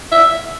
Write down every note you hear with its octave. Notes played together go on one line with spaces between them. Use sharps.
E5